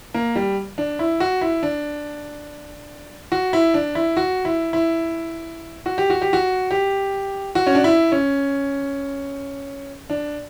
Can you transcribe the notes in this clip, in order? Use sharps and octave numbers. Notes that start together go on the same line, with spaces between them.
A#3
G3
D4
E4
F#4
E4
D4
F#4
E4
D4
E4
F#4
E4
E4
F#4
G4
F#4
G4
F#4
G4
F#4
C#4
D4
E4
C#4
D4